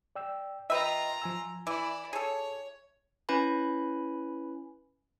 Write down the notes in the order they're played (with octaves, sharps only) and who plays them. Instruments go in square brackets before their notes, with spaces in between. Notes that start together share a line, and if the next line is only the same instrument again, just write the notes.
[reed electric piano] D5 G5 E6
[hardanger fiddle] F4 A#5 [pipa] B4 E5 [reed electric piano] D#5 G5
[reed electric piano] F3 G#5 E6
[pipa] E3 [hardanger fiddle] E4 D5 [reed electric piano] D6
[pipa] G#4 A4 [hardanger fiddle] C#5
[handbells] C#4 E4 B4 G#5 B5